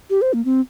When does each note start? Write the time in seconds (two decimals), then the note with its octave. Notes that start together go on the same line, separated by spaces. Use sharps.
0.10 G4
0.22 C5
0.33 A#3
0.45 C4